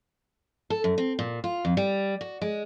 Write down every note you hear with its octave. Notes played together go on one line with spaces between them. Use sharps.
A4
F#2
C4
A#2
F4
F2
G3
F#4
G#3